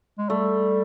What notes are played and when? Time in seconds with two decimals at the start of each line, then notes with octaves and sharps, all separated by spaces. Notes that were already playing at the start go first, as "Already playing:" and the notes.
0.18 G#3
0.30 G3 A3